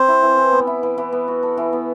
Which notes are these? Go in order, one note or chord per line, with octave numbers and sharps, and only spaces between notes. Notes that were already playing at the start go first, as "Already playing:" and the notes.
Already playing: C4 C5
E4
E3
E3
B3
E4
E3
E3
B3
F#4
A4
E3
B3